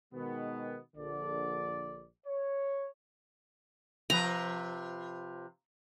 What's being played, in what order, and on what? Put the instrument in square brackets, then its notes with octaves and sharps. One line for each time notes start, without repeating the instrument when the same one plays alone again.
[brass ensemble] B2 D#3 G#3 B3
A#1 D3 D5
C#5
[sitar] C3 F3 B4 [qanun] A#5